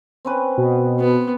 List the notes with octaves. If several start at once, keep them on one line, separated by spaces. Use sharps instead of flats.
C4 C#4 B4
B2
B3